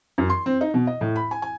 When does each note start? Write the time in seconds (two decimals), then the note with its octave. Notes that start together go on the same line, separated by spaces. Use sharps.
0.18 F#2
0.30 C6
0.46 C4
0.61 D#4
0.74 B2
0.87 D#5
1.01 A2
1.16 B5
1.31 G#5
1.42 G#5